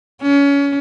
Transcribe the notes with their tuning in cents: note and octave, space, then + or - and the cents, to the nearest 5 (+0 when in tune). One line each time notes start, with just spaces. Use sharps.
C#4 +25